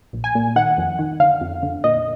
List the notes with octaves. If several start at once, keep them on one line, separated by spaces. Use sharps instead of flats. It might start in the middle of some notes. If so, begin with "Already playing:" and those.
A#1
G#5
A#2
D#3 F#5
F2
D#3
D3 F5
F2
D3
A#2 D#5